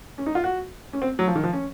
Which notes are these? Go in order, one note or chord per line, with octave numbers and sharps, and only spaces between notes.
C#4
D#4
F4
F#4
C#4
C4
F#3
F3
D#3
F3
C#4